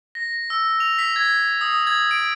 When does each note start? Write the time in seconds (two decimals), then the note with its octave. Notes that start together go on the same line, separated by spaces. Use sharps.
0.15 A#6
0.50 E6
0.80 F7
0.99 B6
1.16 G#6
1.61 D#6
1.87 G#6
2.11 D7